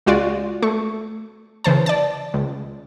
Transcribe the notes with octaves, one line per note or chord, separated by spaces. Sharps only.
C#2 G#3 F4 F#4 D5
A3 C#6
C#3 E3 C5 A5
D5 A5
C#2